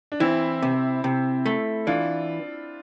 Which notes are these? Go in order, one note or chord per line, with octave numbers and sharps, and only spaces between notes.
D4
E3 C4 E4
C3
C3
A3
E3 D4 F4